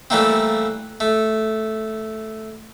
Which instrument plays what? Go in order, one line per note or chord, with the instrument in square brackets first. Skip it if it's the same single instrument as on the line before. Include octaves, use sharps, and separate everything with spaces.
[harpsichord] E3 G3 A3 A#3 C4
A3